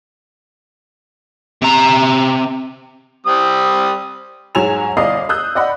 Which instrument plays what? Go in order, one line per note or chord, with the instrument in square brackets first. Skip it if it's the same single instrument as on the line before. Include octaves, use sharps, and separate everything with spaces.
[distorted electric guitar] C3 A#5
[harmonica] G3 C4 D#6
[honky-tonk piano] G#2 F#3 C#5 G#5 E7 F7
G1 D5 D#5 F5 D#6 C7
D#6 E6 F#6 G6
D5 D#5 F#5 B5